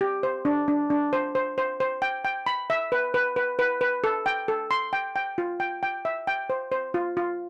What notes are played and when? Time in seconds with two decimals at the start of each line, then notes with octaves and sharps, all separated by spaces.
0.01 G4
0.23 C5
0.45 D4
0.68 D4
0.90 D4
1.13 C5
1.35 C5
1.58 C5
1.80 C5
2.02 G5
2.25 G5
2.46 B5
2.70 E5
2.92 B4
3.14 B4
3.36 B4
3.59 B4
3.81 B4
4.04 A4
4.26 G5
4.48 A4
4.71 C6
4.93 G5
5.16 G5
5.38 F4
5.60 G5
5.83 G5
6.05 E5
6.27 G5
6.50 C5
6.72 C5
6.94 F4
7.17 F4